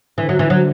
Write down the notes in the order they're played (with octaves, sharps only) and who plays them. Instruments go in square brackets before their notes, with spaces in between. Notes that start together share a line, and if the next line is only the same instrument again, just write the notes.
[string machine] D3 [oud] E3
[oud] F#3
E3
F#3